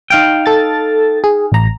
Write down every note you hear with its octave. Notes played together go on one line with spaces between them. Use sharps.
D#4 F5 G5
A4 A6
G#4
A1 A#5